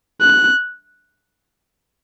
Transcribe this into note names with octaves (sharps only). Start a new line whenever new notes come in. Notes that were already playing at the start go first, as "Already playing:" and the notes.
F#6